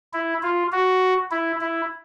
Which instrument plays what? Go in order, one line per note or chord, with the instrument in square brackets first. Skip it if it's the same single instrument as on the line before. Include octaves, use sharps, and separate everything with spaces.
[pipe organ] E4
F4
F#4
E4
E4